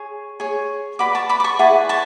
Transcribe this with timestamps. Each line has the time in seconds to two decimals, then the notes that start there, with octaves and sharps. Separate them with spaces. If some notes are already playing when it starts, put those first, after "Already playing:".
Already playing: G#4 C#5
0.40 G#4 C#5
0.99 F#4 B4 D5 B5 D6
1.15 A5 C#6
1.29 B5 D6
1.40 D6
1.44 A5 C#6
1.59 E4 G#4 B4 D5 F#5 A5
1.89 A5 C#6